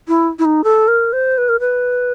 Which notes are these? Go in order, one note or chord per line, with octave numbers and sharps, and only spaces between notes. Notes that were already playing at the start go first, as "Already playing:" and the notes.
E4
E4
D#4
A4
A#4
C5
B4
A#4
B4